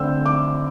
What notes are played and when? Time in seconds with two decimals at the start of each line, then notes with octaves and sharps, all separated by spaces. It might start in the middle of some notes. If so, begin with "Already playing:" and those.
Already playing: D3 A3 C4 E6 G6
0.26 D6